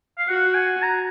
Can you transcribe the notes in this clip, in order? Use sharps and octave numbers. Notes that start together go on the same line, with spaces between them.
F5
F#4 F#5
G#5
A#5